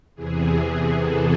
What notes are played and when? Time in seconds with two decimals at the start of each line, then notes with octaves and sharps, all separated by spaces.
0.15 E2 C3 E3 G#4
1.01 A4